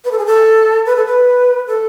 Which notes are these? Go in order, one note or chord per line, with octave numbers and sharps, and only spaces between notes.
B4
A4
G#4
A4
B4
A4
B4
A4